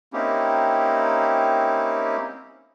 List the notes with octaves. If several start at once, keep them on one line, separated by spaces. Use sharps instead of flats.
A#3 C4 C#4 D#4 E4 G4